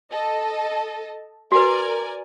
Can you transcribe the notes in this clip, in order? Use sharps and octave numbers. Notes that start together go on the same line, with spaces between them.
A4 D#5 A5
F#4 A#4 B4 D5 G#5